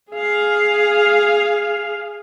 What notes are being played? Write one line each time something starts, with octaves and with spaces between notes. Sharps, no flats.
G#4 F5